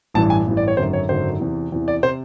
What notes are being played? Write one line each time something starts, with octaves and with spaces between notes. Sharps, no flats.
A1 G2 E3 A5
G#5
A1 G2 E3
D5
C#5
G#1 F#2 D3 F#3 C5
C#5
G#1 F#2 D3 F#3 C5
E2 C3 E3
E2 C3 E3
D5
C3 C5